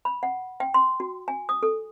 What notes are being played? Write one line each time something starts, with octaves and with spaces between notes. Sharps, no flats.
B5
F#5
G5
C6
F#4
G#5
D#6
A4